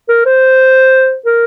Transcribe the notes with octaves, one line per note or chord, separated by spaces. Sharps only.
A#4
C5
A#4